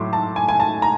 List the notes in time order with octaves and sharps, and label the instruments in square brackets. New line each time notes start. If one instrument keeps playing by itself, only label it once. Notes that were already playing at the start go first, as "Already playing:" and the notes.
Already playing: [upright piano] A2 F#3 A3 C6 D6
A5
G#5
G#5
A5
A#5